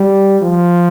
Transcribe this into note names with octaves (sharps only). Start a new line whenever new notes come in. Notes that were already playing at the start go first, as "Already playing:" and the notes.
Already playing: G3
F3